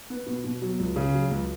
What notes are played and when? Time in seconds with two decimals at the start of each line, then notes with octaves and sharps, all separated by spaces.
0.10 B3
0.26 B2
0.44 B2
0.62 F#3
0.79 C#2
0.96 C#3
1.14 F#3
1.31 C#2